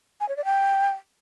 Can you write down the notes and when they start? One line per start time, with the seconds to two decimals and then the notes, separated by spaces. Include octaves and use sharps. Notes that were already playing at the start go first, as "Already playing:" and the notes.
0.20 G#5
0.29 C#5
0.37 D5
0.45 G5